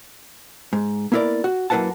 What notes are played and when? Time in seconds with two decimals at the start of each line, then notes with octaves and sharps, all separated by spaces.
0.73 G#2
1.12 A#3 B3 E4 A#4 D5
1.44 F#4
1.70 F#2 A#3 E4 B4 F#5 A5